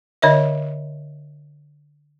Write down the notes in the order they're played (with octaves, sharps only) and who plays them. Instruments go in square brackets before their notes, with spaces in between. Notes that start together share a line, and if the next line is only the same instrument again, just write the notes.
[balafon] D3 C#5 D#5 E5